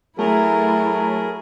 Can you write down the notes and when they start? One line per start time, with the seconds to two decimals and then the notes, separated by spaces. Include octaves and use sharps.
0.19 F#3 A3 E4 G#4 A#4